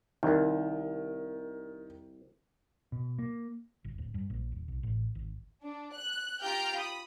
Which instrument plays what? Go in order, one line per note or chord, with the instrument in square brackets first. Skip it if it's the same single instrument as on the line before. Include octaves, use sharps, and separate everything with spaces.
[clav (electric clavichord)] C2 [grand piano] D#3
[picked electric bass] B2
A#3
[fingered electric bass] G1
D1
G2
A#1
D#1
B1
A1
G#1
[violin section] D4
F#6
F4 G4 G5 A#5 F6 G6
B5 D#6